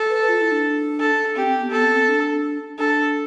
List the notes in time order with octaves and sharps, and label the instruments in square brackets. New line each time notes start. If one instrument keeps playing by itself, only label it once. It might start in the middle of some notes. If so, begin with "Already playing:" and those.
Already playing: [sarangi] A4
[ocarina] B4
F4
E4
D4
[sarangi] A4
[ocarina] C4 [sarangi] G4
[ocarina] C4
B3
[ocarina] B3 [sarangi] A4
[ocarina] C4
C4
D4
[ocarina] D4 [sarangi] A4